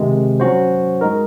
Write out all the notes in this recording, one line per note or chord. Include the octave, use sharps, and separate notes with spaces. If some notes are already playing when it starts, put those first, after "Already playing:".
Already playing: C3 D#3 G#3
F#3 C#4 F#4 C5
G#3 D#4 A#4